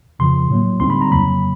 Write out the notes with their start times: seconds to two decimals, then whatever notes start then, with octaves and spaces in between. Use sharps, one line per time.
0.19 F2 C#3 F3 C6
0.49 A2 F#3 A#3
0.80 D2 D3 G3 C4 D#4 C6
0.90 B5
1.01 A#5
1.10 F2 C#3 F#3 A#3 B5